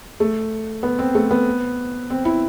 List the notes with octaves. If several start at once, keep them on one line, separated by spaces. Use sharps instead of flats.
A3
B3
C4
A3
B3
C4
E4